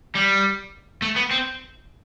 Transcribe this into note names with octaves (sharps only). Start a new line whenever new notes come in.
G3
A3
B3
C4